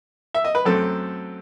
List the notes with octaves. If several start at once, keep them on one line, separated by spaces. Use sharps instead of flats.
E5
D#5
B4
F#2 F#3 A3 C4 A4